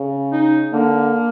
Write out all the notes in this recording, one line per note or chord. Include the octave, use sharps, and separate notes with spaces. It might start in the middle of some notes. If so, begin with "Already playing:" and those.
Already playing: C#3
D#4
D3 A#3